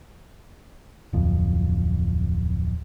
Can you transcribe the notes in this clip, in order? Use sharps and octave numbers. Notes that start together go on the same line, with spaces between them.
D1 F2